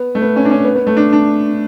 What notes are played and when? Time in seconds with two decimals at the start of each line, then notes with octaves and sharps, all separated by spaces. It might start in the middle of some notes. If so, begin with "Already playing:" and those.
Already playing: B3
0.15 A3
0.22 B3
0.36 C#4
0.45 D4
0.51 C#4
0.65 B3
0.75 B3
0.87 A3
0.97 D4
1.13 D4